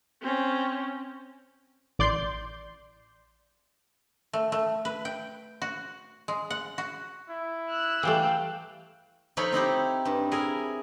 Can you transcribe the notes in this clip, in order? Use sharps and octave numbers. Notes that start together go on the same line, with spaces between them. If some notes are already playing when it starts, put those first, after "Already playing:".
C4 C#4
A1 D5 C6 G6
A3
A3
B4
G5
F#4
G#3
F#5
F#4
E4
E6 F#6
E3 G3 A3 F5 G5
F3 D#4 A4 C#5 F5 B5
C4 D#4 E4 G4
G2
E4 G#4 A#4